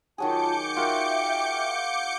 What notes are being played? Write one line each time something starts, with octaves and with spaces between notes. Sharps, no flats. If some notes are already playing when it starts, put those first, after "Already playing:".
D#3 F#3 F4 G#4 A5 D6 G6 C#7
F4 F#4 A#4 E5 G5